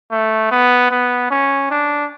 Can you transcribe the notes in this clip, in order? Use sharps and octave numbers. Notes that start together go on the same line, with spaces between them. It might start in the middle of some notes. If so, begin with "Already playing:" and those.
A3
B3
B3
C#4
D4